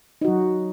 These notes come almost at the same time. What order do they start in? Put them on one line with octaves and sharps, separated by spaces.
D#4 F#4 F#3